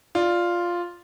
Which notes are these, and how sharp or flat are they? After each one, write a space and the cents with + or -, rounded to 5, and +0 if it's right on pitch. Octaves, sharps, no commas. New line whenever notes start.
F4 +0 D5 +5